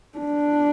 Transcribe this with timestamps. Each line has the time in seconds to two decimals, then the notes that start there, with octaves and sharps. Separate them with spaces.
0.18 D4